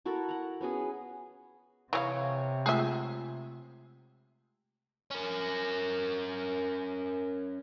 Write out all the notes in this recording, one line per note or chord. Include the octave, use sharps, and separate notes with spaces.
E4 F#4 A4 A#4
F#5 A#5
B3 C#4 F#4 G#4
C3 E3 G#4 C#5 F5
G#3 A3 F4 G#4 E5
C#4 A#4